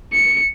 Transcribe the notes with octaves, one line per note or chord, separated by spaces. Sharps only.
C#7